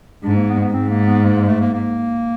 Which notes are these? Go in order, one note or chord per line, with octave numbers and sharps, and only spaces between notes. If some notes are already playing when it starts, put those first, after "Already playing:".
G#2 D4
A#3
B3
B3
G#2 C4
A#3
B3
A#3
A#3
A3
A#3
A#3